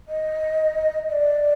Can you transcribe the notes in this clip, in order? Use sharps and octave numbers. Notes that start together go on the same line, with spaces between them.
D#5
D#5
D5